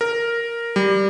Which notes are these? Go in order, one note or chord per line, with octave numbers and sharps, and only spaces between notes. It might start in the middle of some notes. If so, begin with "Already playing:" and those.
A#4
G3